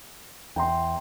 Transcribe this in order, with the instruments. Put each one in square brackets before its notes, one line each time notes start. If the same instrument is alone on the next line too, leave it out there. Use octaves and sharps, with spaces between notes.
[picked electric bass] E2 [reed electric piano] G5 A#5 C6